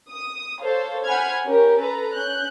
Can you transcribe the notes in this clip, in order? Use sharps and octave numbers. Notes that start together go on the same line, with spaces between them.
D#6
A4 C5 C#5 F5
C5 F#5 G#5 B5 F6 G#6
C#4 G4 A#4 C#5
A4 B4 A#5
C#4 F#6 G6